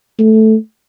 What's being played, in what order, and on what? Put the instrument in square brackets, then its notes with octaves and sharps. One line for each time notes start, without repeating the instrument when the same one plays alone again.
[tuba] A3